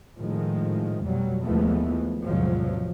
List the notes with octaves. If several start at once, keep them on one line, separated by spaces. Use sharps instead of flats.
A2 D#3 F3 G#3 A3
F2 B2 F#3 G3
D#2 E3 F3 G#3 A3 B3
A1 E2 C3 F3 F#3 G#3